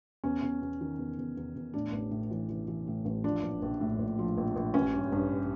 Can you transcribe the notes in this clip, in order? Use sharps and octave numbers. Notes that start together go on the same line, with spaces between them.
E2 C#4
E2
E2
D#3
E2
E2
E2
E2
A2 D4
A1
A2
E3
E3
E3
A2
A1
F3 D4
A#1
A#1
A2
A#1
F3
A#1
A#1
A1 C#4
G2
G2